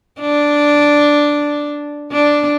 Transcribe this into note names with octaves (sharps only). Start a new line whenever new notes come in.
D4
D4